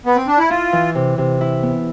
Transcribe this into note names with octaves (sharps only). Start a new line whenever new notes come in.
B3
C4
D4
E4
E4 F4
E3
C3
C3
E4
B3